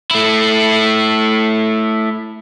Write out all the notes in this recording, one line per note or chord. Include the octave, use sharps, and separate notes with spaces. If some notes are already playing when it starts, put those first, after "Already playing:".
A3 E4